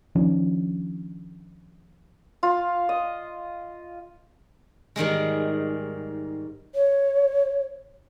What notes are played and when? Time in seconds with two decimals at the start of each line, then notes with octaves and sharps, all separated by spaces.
0.15 D#3 F3 C#4 D4
2.43 F4
2.89 D#5
4.96 G#2 D#3 G3 G#3
6.75 C#5